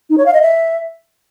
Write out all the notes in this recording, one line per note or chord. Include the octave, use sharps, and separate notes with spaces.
D#4
C#5
F5
D#5
E5